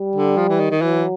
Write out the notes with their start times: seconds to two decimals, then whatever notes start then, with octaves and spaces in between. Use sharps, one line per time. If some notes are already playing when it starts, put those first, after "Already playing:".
Already playing: G3
0.16 D3
0.37 F3
0.49 E3
0.60 D#3
0.71 D#3
0.82 E3 F#3